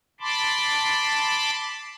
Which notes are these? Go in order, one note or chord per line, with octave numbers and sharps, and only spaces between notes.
A5 B5 C6 D6